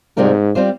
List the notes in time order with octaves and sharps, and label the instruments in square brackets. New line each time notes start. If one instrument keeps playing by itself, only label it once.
[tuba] G#2 [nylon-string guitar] C3 G3 C4 F4 A#4
[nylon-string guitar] G3 C4 F4 C5